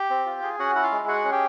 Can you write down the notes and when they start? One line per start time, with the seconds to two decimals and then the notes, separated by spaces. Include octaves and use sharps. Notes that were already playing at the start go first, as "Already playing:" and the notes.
Already playing: G4 G5
0.10 C4
0.26 F4
0.43 G#4
0.59 C#4 F#4 F#5
0.75 E4 F#5
0.83 F4 F5
0.92 G#3
1.08 F#4 G#4 F#5
1.25 C#4
1.32 G4 G5